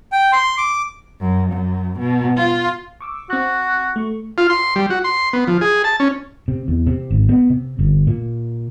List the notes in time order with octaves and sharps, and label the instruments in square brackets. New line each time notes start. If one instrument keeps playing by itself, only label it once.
[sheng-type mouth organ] G5
C6
D6
[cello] F#2
F#2
B2
F4
[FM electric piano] C#6 D6 E6
[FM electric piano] C4 F#6 [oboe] F#4
[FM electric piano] A3 C#6
[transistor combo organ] F4
C6
G3
F#4
C6
B3
F3
G#4
A5
C#4
[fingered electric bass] C3
E2
C3
G#1
B3
C3
G1
A#2